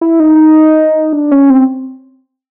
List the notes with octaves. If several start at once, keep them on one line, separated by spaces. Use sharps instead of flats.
E4
D#4
D4
C#4
C4